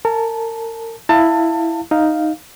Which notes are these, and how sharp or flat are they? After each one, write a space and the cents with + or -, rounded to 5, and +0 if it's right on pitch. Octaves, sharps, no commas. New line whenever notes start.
A#4 -35 A5 -25
E4 +0 F5 +0 A5 +25
D#4 +0 F5 +0